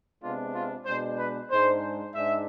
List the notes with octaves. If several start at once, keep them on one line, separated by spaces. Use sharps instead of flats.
C3 G#3 B3 D4 F4
F4
B2 G#3 D4 C5
B4
G#2 G#3 D4 C5
G#2 G#3 D4 E5